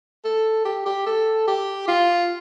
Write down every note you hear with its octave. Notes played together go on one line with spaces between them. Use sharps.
A4
G4
G4
A4
G4
F4